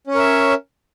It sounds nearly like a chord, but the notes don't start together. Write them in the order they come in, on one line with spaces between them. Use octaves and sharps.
C#4 C#5 A#4 E5